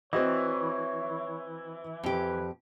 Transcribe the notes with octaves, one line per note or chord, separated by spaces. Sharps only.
E3 C4 F#4 C#5 D#5
F2 G4 B4